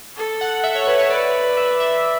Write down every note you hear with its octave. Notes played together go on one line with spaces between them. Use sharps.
A4
F#5
E5
C#5
B4
C#5
B4 D5
E5
E5